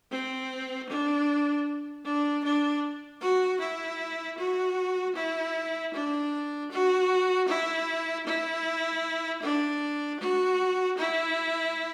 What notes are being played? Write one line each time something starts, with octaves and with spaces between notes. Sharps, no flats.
C4
D4
D4
D4
F#4
E4
F#4
E4
D4
F#4
E4
E4
D4
F#4
E4